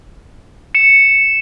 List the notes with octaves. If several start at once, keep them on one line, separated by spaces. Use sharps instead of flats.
C#7 E7